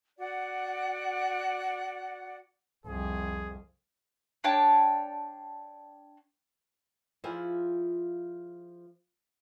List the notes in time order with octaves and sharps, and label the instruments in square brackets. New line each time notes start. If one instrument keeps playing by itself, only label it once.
[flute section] F#4 D5 F#5
[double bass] C2 F2 [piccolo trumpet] G#4
[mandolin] D4 C#5 G5 A5
[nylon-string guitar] F3 E4 F4 G#4